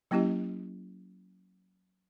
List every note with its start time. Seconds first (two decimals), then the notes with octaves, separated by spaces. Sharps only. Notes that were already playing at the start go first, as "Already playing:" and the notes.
0.11 F#3 A#3 C#4 E4 G4 D#5